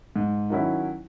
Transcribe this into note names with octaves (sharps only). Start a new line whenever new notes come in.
G#2
D#3 F#3 C#4 E4